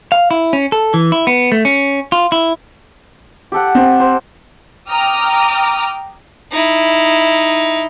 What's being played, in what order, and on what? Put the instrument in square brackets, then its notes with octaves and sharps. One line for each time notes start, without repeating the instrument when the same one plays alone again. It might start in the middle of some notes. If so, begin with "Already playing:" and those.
[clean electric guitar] F5
E4
C#4
A4
E3
E4
B3
A3
C#4
F4
E4
[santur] G4 A4 F#5
[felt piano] C4
[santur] C5
[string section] G5 A#5 D6 D#6 F6
[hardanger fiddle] D#4 E4